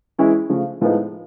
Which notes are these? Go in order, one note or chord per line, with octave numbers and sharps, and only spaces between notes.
E3 G#3 C#4 E4
C#3 F3 A3
A2 F3 G#3 B3 D#4